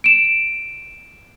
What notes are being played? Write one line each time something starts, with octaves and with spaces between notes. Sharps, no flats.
D7 E7